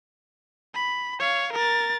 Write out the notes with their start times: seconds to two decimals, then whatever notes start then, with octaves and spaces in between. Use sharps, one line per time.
0.74 B5
1.20 C#5 F5
1.53 A#4 A6